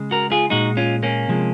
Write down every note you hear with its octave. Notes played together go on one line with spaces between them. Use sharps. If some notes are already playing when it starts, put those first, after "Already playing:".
Already playing: C#3 G#3
F#4 A#4
F4 G#4
A#2 G#3 D#4 F#4
C#4 F4
A#3 C#4
C3 F3 G#3